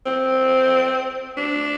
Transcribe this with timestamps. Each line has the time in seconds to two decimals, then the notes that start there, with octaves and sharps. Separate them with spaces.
0.06 C4
1.37 D4